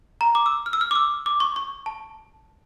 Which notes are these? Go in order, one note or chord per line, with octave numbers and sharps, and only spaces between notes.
A#5
D6
E6
F6
E6
F6
D6
E6
D6
C#6
C#6
A5